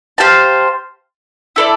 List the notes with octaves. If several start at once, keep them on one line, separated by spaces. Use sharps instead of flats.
G4 C5 F5 A5
E4 A4 D5